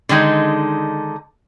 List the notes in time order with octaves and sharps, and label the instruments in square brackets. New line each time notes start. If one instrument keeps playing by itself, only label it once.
[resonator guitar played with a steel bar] D3 D#3 G#3 D#4